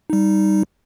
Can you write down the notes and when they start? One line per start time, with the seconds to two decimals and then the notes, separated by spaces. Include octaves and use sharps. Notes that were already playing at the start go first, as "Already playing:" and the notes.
0.10 G3 D#4